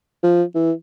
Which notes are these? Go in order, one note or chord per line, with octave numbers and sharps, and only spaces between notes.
F3
E3